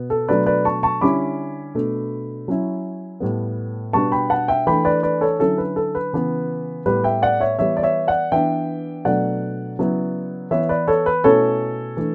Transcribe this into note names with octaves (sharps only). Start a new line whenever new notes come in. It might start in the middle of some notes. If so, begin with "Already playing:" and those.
Already playing: B2 B3
A4
B2 F#3 A3 D4 B4 D5
B4 D5
A5 C#6
A5 C#6
D3 G3 C#4 E4 B5 D6
B2 A3 D4
F#3 C#4 E4
A2 G3 B3
B2 G3 B3 D4 A5 C#6
G5 B5
F#5 A5
E5 G5
E3 A3 D4 G5 B5
B4 D5
B4 D5
A4 C#5
D3 F#3 C#4 E4 A4
B4
A4
B4
C#3 E3 B3
A2 G3 B3 B4
E5 G5
D5 F#5
C#5 E5
E3 G3 B3 C#5 E5
D5
C#5 E5
D5 F#5
E3 B3 D4 E5 G5
B2 F#3 A3 D4 D5 F#5
C#3 F#3 B3 E4
E3 B3 E4 C#5 E5
B4 D5
A4 C#5
B4
B2 A3 C#4 E4 A4 C#5
E3 A3 D4